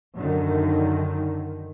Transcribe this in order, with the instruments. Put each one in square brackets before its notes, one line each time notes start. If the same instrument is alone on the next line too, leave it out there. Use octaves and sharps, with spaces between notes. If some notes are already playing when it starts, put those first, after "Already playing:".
[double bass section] F#2 D3 D#3